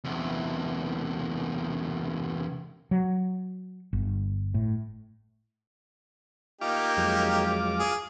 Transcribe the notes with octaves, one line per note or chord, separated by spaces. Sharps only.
E2 C3
F#3
G1
A2
A#3 D#4 F4 G4 D6
F2 F#3 G#3
G#4